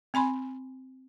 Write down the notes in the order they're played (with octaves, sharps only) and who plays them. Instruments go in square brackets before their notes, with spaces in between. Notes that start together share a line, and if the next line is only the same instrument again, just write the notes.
[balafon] C4 G#5 B5 C6